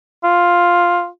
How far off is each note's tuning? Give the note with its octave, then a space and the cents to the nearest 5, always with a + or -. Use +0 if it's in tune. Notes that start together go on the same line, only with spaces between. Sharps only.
F4 +5